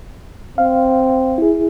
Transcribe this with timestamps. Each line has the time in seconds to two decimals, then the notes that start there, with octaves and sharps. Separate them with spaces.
0.58 C4 F5
1.38 E4 G#4